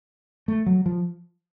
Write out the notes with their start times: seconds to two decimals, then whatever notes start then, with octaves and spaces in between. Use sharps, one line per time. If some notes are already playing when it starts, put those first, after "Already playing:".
0.48 A3
0.66 F#3
0.86 F3